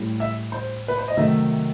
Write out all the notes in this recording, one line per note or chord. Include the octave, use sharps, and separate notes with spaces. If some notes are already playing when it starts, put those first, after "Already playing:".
Already playing: A2 G3
E5
C5
B4
C5
D#5
C3 D#3 F#3 A3 E5